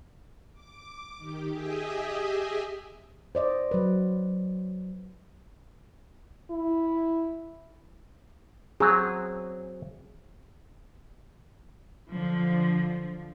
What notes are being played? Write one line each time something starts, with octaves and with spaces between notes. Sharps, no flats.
D6
D#3 G4
G4 G#4 D#5 E5 G#5 D#6
C5 D5 D#5
F#3 B4
E4
F#3 C4 G#4
D3 F3